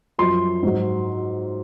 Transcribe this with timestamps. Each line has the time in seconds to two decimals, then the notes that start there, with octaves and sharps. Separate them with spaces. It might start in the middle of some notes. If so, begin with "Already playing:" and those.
0.18 F#2 F3 C6
0.63 G#2 F#3